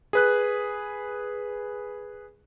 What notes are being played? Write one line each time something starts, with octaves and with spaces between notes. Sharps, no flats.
G#4 B4 F#6